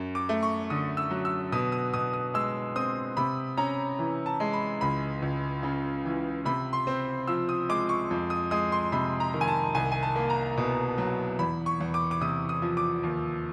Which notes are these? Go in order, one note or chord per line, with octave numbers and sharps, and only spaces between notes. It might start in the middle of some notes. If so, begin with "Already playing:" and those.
Already playing: F#2
D6
A3
C#6
D3 D#6
E6
F#3
E6
B2 D#6
D#6
B2 D#6
D#6
G#3 E6
C4 D#6
C3 B5
C#4 A#5
E3
A5
G#3
B5
C#2 B5
C#2
C#3
E3
C3 B5
C6
C4
F3 E6
D#6
G#3 D6
C#6
F2
D#6
G#3 D#6
C6
C3 B5
A#5
D#3
G#5
A5
C2 G#5
G#5
A5
A#3
A#5
B2
F#3
E2 B5
C#6
E2
D6
D6
C3 D#6
D#6
F3
D6
D#2